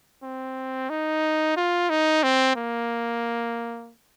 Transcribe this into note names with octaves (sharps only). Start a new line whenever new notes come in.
C4
D#4
F4
D#4
C4
A#3